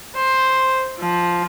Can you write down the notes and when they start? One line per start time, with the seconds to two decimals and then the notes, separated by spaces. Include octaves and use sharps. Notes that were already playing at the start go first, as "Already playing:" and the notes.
0.16 C5
0.99 F3